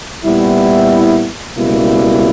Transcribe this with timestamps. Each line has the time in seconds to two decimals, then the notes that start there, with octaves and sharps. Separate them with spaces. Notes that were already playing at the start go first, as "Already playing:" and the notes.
0.25 A#2 G3 B3 E4
1.57 C#2 B2 G3 A#3 E4